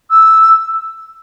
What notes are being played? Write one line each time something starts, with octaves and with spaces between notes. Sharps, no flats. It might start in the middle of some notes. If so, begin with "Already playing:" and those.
E6